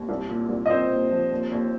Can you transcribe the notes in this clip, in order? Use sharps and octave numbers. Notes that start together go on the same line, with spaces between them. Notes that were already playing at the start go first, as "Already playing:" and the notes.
Already playing: D#2
C2
A#2
C2
D#5
A#2 C4 C5
A#2
F3
D#2
D#2